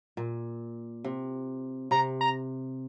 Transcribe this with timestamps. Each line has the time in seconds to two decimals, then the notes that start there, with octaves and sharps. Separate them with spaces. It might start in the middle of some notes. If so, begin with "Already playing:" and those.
0.17 A#2
1.04 C3
1.91 C3 A#5
2.21 A#5